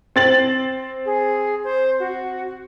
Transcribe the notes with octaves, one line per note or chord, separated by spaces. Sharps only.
C4 A6 F#7
G#4
C5
F#4